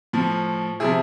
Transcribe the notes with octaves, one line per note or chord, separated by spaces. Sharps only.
A2 F3
C3 F3 E4 G#4